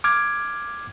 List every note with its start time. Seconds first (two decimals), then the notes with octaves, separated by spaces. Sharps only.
0.04 D6 F6 G#6